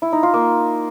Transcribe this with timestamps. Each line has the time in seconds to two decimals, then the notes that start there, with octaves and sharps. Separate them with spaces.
0.02 E4
0.13 D#4
0.23 F4
0.33 A#3